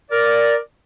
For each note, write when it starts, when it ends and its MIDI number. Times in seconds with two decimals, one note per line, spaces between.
0.12 0.57 70
0.12 0.57 74